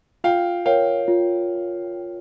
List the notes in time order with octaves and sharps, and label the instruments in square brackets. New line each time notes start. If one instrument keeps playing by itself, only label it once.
[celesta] F4 [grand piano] F5 G5
[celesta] A#4 C#5 [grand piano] F5 G5
[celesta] F4